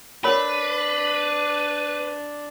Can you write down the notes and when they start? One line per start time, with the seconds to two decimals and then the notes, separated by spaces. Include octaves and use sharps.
0.24 D4 A#4 B4 C#5 B5